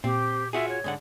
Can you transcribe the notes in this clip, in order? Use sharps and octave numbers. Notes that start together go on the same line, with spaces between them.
A#2 C4 G4
F4 F#4 G#4 E5
C#5
G#2 D3 F#5